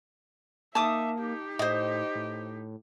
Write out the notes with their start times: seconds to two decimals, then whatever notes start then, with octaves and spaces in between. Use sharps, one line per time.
0.75 A#3 D#4 E5 A5 D6 D#6
1.20 D#4 G4
1.59 A2 C5 D#5
2.15 A2